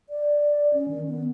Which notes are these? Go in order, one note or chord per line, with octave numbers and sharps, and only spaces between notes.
D5
C#4
D#3
B3